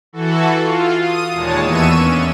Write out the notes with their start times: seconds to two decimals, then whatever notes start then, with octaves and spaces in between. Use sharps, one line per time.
0.13 E3 F#4 A4
0.61 F4
1.01 D#6 D#7
1.33 D#2 A#2 G#3 C#5 A5
1.63 E2 E3 B3 C#6 E6 D#7
1.96 C#4 D4